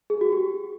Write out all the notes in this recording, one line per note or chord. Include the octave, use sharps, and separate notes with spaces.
G#4
F#4
G4